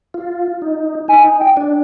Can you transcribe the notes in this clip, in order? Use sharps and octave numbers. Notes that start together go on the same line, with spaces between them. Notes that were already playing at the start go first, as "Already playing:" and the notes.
F4
D#4
D#4 G#5
G5
D4